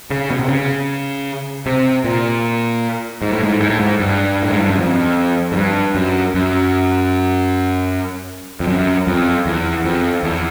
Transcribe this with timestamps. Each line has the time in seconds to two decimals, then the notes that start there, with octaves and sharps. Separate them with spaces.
0.10 C#3
0.31 B2
0.39 C3
0.49 C#3
1.66 C3
2.04 A#2
3.22 G#2
3.32 A2
3.43 G#2
3.60 G#2
3.70 A2
3.80 G#2
4.00 G2
4.43 A2
4.52 G#2
4.60 G2
4.69 F#2
4.78 F2
5.52 G#2
5.56 G2
5.95 F#2
6.34 F#2
8.60 F2
8.68 F#2
9.07 F2
9.46 E2
9.84 F2
10.23 E2